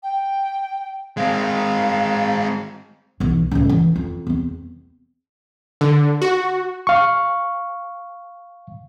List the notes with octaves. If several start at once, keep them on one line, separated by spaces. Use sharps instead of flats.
G5
G#3 C4 F5
B1 E3
C#2 A2
E3
F2
E2 C4
D3
F#4
F5 C#6